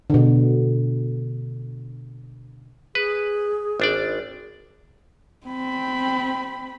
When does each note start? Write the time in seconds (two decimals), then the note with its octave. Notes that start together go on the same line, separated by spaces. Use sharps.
0.10 B2 D3
2.95 G#4 B4
3.80 G#1 D4 D5
5.47 C4 B5